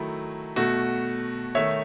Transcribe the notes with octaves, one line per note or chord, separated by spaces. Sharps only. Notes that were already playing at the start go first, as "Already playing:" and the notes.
Already playing: D#3 F#3 A3 E4
B2 A3 F#4
D#3 A3 C#5 E5